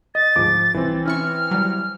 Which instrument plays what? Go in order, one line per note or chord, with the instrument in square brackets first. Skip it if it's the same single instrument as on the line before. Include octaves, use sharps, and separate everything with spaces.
[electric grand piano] D#5 [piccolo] A6
[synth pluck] D2 G#2 [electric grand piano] F3 D6
[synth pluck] C2 [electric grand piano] E3 C4
[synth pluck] C#4 E4 C#6 [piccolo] F6
[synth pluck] F#3 G3